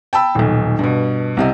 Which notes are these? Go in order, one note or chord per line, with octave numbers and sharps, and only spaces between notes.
G5 A5 B5 E6
D#1 B1
G2 B2
C2 C3 D#5